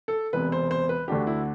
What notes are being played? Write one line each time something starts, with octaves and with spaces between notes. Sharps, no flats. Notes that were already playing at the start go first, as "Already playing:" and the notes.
A4
E1 E2 C3 B4
C5
C5
B4
D2 D3 A3 D4 F#4 G4
E4